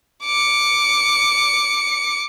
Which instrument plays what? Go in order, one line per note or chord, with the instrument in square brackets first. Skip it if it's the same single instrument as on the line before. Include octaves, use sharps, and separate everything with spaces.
[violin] D6 C#7